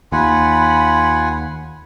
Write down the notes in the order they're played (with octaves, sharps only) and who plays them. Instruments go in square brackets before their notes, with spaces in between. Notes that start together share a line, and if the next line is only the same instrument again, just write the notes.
[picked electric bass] D#2 [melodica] F4 F#5 G#5 [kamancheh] B5